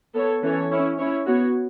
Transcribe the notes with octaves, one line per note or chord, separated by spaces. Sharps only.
B3 A4 C#5
E3 C#4 A4 C#5
C#4 E4 C#5
C#4 E4 C#5
B3 F#4 C#5